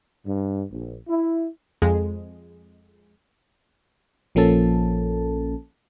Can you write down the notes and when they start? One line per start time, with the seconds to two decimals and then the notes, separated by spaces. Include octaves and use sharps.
0.25 G2
0.71 A#1
1.08 E4
1.82 F2 G#3
4.35 A#1 F3 A#3 C#4 A4 A5